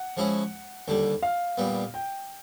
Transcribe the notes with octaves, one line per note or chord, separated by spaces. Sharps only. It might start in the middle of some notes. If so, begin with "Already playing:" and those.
Already playing: F#5
F3 G#3 C#4 E4
D#2 D3 G3
F5
A#2 G3 B3
G5